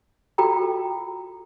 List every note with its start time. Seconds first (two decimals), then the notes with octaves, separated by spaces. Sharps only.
0.38 F4 F#4 A4 G5 A#5